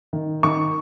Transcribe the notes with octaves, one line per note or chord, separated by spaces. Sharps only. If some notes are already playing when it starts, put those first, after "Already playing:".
D#3
D#3 C#6